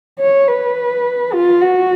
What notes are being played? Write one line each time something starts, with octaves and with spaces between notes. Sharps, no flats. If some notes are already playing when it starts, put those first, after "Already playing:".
C#5
B4
F4
F#4